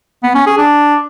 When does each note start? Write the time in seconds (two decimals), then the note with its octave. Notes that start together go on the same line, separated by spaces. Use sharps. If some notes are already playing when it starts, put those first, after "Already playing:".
0.23 B3
0.35 C#4
0.46 G#4
0.58 D4